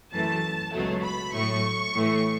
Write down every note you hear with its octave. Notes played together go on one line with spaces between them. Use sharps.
F#2 E3 A3 A5
C#2 B2 F#3 A3
B5
A2 F#3 A3 C#6
A2 E3 A3